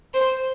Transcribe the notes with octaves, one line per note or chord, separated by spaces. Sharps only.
C5